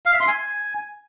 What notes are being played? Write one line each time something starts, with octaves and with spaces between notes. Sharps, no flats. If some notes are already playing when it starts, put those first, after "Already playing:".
F5
E5
C6
G#5